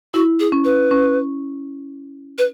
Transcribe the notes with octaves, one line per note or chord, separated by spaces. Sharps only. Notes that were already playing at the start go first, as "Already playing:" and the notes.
E4 F#4
G#4
C#4
B4
C#4
B4